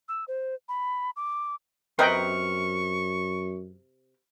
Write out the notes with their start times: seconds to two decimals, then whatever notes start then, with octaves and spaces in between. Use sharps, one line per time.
0.08 E6
0.28 C5
0.69 B5
1.16 D6
1.99 F#2 C3 C4 A#4 B4 D#5 G5 C#6